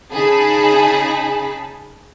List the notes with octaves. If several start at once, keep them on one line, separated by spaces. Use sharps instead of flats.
C#3 D#4 G#4 G#5 A5 B5